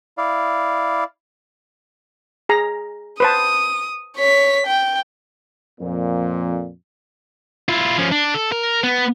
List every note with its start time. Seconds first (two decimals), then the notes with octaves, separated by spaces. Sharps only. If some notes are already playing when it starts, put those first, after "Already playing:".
0.18 E4 D5 F5
2.49 G#4 A#5
3.20 B4 C5 A5 D#6
4.16 C#5 B6
4.66 G5
5.80 F2 A#2
7.69 E4 F4
7.98 F3 C#4
8.12 D4
8.34 A4
8.52 A#4
8.83 B3